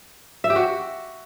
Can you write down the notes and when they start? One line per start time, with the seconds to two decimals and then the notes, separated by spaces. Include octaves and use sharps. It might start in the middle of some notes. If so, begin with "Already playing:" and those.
0.44 E5
0.50 G4
0.56 F#4